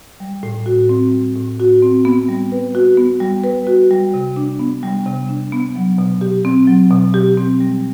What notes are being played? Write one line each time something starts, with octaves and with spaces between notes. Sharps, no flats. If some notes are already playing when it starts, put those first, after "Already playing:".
G3
A2
F#4
C4
G3
A2
F#4
C4
B3
G3
B4
F#4
B3
G3
B4
F#4
G3
C3
D4
B3
G3
C3
D4
B3
F#3
B2
G4
C4
F#3
B2
G4
C4
G3